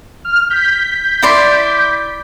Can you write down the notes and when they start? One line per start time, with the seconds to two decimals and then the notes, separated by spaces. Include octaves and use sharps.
0.25 F6
0.50 G6 B6
1.22 E4 D5 C6